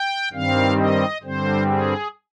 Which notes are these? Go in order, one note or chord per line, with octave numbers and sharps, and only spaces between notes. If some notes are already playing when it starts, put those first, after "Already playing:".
Already playing: G5
G2 D#3 G3 C4 F5
D#5
G2 D3 G3 C4 C5
G#4